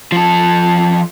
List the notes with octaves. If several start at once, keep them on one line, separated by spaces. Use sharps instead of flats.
F3 A4